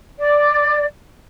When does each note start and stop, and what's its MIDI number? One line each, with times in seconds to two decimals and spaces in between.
0.19 0.85 74